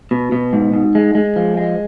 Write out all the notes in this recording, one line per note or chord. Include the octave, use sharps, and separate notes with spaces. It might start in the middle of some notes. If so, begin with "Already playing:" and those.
B2
B2
G#2
G#2
G#3
G#3
F3
G#3